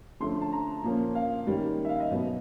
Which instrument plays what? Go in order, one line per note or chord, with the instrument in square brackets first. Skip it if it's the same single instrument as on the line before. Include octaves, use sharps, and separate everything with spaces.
[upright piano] D3 F3 A3 C#4 C6
A5
A#5
A#2 F3 A#3 C#4
F5
D#3 G3 A#3 C#4
E5
F5
D#5
B2 F#3 B3